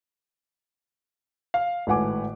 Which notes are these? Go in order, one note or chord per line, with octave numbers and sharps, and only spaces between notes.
F5
G#1 A2 B4 F#5 G#5 D6